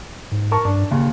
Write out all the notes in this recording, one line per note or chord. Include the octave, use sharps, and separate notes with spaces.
G#2
A#4 A5 C#6
G2 D4
D#2 A#2 C#3